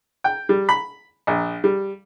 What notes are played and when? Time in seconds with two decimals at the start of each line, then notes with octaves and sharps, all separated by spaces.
0.24 G5
0.49 G3
0.69 B5
1.27 A#1
1.64 G3